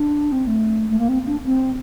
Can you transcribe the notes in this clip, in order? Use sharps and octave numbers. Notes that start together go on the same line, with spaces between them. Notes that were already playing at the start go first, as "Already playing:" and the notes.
Already playing: D4
C4
A3
A3
A#3
C4
D4
C4